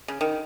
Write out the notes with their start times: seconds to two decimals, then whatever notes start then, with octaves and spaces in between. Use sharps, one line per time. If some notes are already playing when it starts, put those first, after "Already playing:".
0.08 C#3
0.21 D#3